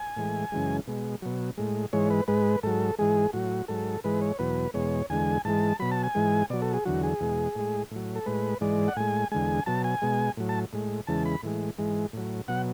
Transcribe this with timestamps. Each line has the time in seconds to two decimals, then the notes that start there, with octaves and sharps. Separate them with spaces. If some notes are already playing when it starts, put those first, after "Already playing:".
Already playing: G#5
0.16 A2 E3 G#3
0.52 F#2 C#3 E3 G#3
0.87 B2 G#3
1.22 B2 F#3
1.58 A2 G#3
1.93 G#2 E3 G#3 C#5
2.10 B4
2.28 G#2 G#3 B4
2.63 G#2 F#3 A4
2.99 G#2 E3 G#3 G#4
3.33 A2 F#3 F#4
3.68 G#2 F#3 A4
4.04 G#2 E3 G#3 B4
4.22 C#5
4.39 E2 B2 F#3 B4
4.74 E2 B2 G#3 C#5
5.10 E2 D3 G#3 G#5
5.45 G#2 E3 G#3 A5
5.80 B2 F#3 B5
5.91 A5
6.03 G#5
6.15 G#2 E3 G#3
6.50 B2 F#3 D5
6.62 A4
6.74 G#4
6.86 E2 D3 F#3 F#4
7.03 G#4
7.20 E2 B2 G#3
7.56 A2 G#3
7.91 A2 F#3
8.16 A4
8.26 A2 G#3 B4
8.61 G#2 E3 G#3 D5
8.88 F#5
8.96 A2 G#3 G#5
9.32 E2 D3 G#3 G#5
9.66 B2 F#3 A5
9.84 G#5
10.02 B2 G#3
10.37 A2 F#3
10.49 A5
10.73 A2 G#3
11.07 E2 C#3 E3 G#3 A5
11.25 B5
11.43 A2 E3 G#3
11.78 G#2 E3 G#3
12.13 A2 F#3
12.48 B2 F#3 F#5